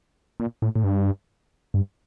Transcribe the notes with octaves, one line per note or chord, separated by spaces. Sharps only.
A#2
A2
A2
G2
G2